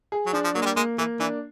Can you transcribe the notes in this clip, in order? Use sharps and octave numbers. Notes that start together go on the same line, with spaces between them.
G#4
F#3
F3 D4
F3
F#3 A#3
G#3
G3
G#3 A#3
E3 A#3
E3 D4